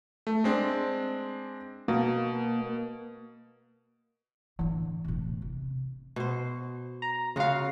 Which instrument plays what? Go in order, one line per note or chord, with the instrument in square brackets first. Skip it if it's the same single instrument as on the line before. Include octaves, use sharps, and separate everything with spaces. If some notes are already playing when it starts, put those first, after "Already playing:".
[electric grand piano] A3
G#3 C4 D4
[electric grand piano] B2 [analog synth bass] A#3
[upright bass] A1 D3 [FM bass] E3
[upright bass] E1 A2
C3
[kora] B2 C5
[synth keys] A#5
[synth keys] C#3 F5 [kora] F4 F#4